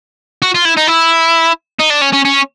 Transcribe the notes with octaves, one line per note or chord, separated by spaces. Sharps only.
F#4
F4
E4
D#4
E4
D#4
D4
C#4
C#4
C#4